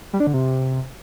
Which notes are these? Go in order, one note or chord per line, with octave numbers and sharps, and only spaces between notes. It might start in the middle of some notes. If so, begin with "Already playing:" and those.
G3
D4
D3
C3